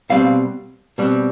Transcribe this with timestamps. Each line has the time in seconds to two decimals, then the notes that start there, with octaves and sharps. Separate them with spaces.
0.10 B2 G3 C4 F5
0.98 B2 G3 C4